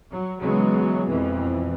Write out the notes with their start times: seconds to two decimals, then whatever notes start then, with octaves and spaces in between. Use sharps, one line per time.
0.11 F#3
0.40 C#3 E3 F#3 G#3 B3
1.07 F2 B2 E3